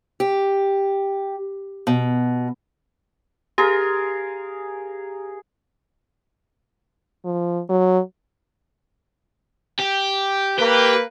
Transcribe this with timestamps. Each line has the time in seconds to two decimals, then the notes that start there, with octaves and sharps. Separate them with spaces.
0.20 G4
1.87 B2
3.58 G4 G#4 A#4 F5
7.25 F3
7.69 F#3
9.80 G4
10.58 A#3 G4 B4